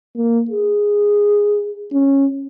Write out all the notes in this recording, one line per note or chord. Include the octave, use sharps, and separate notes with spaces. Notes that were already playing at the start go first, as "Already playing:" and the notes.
A#3
G#4
C#4